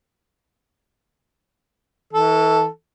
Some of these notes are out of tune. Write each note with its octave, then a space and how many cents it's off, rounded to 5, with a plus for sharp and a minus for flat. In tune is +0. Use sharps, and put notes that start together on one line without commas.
E3 -40 A4 +0